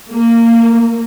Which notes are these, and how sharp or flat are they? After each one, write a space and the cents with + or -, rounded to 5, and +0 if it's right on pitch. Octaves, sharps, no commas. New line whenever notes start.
A#3 -15